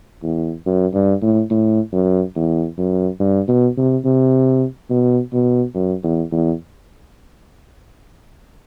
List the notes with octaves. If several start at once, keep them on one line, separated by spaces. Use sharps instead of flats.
E2
F#2
G2
A2
A2
F#2
E2
F#2
G2
B2
C3
C3
B2
B2
F#2
E2
E2